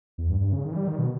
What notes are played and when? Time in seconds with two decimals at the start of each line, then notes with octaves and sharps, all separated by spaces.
0.18 E2
0.30 G2
0.41 G2
0.53 C#3
0.65 D#3
0.72 E3
0.76 G3
0.88 D#3
0.98 B2